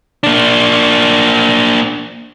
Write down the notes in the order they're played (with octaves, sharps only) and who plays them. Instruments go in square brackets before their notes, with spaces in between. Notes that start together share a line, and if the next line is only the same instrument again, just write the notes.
[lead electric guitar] A#3 D4